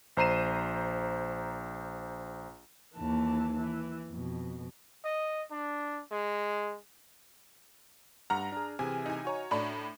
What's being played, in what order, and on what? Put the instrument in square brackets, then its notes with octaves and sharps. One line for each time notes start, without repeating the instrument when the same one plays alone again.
[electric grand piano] A#1 C5 A#5 C7 D#7 E7
[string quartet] D#2 E3 A5
E3
F2 B2
[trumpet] D#5
D4
G#3
[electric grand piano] G2 F#5 F6 [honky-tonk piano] A#5
[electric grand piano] D4 G#4
[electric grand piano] C3 E3 G#4 [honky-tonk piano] G#5
[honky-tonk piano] D#4 G#5
[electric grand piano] F#4 C#5 A#5
[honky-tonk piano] A2 D4 B5